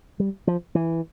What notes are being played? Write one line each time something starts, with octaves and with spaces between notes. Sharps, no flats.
G3
F3
E3